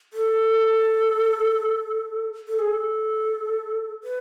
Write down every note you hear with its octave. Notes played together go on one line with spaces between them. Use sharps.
A4
A4
G#4
A4
B4